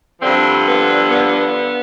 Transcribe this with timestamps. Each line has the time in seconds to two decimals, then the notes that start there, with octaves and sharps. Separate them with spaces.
0.21 G2 D3 F3 C4
0.66 B3
1.11 B3